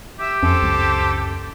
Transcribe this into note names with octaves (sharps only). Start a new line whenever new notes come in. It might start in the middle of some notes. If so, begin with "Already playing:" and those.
G4 E5
F2 C#4 A4 C5
C#2 F#2